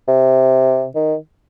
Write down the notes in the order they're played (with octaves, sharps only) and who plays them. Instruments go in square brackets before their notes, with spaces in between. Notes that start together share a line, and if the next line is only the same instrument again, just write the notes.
[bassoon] C3
D#3